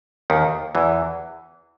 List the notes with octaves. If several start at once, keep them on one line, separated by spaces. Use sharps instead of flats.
D#2 D#3
E2 E3